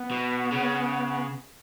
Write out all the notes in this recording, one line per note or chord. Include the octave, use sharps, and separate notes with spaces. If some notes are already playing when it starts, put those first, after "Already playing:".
Already playing: B3
B2
C#3